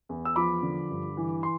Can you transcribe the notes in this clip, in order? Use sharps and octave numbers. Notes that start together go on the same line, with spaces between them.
E2
E6
F3 B5 D6
D3
G2
E3
C6